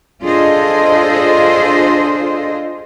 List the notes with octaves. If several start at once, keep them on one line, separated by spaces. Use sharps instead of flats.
D4 F4 G#4 A4 C5 D#5